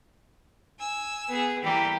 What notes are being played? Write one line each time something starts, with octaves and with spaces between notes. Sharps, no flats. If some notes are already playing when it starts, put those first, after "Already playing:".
G#5 E6
B3 G#4
E3 G3 A#3 G4